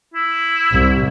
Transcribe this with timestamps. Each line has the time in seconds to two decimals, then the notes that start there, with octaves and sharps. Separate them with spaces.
0.14 E4
0.72 C2